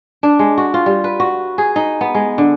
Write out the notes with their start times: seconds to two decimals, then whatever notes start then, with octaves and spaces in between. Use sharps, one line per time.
0.23 D4
0.39 G#3
0.58 F#4
0.74 F4
0.86 G3
1.04 B4
1.20 F#4
1.58 G#4
1.76 D#4
2.01 B3
2.14 G#3
2.38 D3